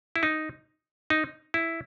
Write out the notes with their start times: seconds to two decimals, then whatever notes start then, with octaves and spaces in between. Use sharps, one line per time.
0.16 E4
0.23 D#4
1.10 D#4
1.54 E4